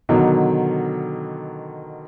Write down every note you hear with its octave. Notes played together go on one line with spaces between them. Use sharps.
B2 D3 D#3 F#3